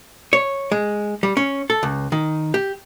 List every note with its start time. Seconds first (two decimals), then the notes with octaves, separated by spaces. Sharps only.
0.33 C#5
0.72 G#3
1.23 G3
1.37 C#4
1.70 A4
1.83 C#2
2.12 D#3
2.54 G4